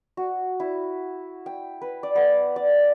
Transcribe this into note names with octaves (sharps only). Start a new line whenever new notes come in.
F#4
E4
G5
B4
D5
B3
D5